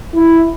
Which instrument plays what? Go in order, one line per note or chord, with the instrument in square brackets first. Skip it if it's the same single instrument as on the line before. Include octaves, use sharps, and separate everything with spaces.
[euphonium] E4